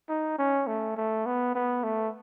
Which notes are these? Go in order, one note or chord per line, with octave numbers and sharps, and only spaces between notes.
D#4
C#4
A3
A3
B3
B3
A3